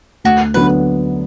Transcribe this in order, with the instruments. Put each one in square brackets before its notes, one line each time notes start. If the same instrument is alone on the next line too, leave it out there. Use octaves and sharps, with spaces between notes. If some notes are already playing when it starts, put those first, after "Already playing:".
[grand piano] D2 [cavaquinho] F#4
[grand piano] D3 F#3 B3 [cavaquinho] B4